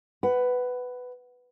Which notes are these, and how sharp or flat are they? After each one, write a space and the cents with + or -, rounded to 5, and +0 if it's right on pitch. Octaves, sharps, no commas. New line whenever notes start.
B4 +10 F#5 +15